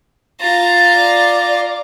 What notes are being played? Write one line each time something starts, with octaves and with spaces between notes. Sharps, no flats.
F4 A#5 A6
D5